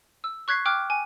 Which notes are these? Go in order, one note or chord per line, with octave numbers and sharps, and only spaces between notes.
E6
C#6 F#6 G#6 B6 C7
G5 D6 F6 F#6
G#5